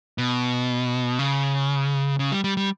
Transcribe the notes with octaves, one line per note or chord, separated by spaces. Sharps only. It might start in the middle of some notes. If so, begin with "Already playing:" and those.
B2
C#3
C#3
G3
G3
G3